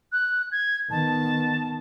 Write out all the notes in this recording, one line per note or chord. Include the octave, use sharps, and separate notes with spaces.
F#6
G#6
D#3 B3 A5